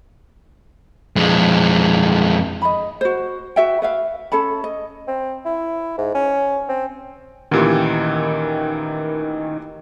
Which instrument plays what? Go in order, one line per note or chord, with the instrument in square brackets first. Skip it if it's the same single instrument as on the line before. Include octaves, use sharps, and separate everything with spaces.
[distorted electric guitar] F2 G#3
[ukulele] D#5 B5
F#4 C5
F#4 E5 G5
B4 E5 F5
C#4 A4 A5 B5
D#5
[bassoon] C4
E4
G#2
C#4
C4
[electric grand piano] D2 A#2 E3 [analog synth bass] D#3 [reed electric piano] C#4 G4